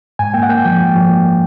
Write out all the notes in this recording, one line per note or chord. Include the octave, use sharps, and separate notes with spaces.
G#2 G#5
A#3 G5
F#5
A#3 G5
F3 G5
G#2
F3
A#3
A#3